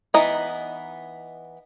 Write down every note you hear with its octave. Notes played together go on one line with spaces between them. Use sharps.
E3 B3 D#4 D#5